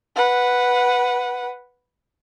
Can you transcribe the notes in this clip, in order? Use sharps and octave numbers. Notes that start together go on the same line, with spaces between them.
B4 F#5